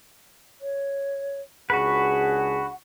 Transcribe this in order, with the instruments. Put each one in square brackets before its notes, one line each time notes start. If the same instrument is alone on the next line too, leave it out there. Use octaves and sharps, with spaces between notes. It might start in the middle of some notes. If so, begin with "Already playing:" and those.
[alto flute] C#5
[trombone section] C#2 D4 G#4 [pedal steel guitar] F#4 B4 [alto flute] F#5